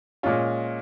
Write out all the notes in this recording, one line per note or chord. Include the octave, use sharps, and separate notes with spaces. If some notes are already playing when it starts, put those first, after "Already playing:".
A#2 G#3 C#4 F4